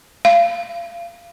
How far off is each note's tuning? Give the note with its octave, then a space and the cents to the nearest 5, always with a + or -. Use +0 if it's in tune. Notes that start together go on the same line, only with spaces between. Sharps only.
F5 -25